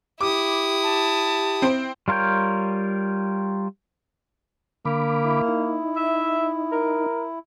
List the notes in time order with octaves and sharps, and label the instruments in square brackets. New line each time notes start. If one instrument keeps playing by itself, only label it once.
[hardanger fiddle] E4 D#6 [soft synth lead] G4 [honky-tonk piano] D6
[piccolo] A5
[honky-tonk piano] C4 C5 D7
[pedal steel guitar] G3 F4 A#4 C#5 G5
[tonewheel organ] D3 B5 D6 [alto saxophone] A#3
[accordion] E4
[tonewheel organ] D#4
[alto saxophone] E5
A#4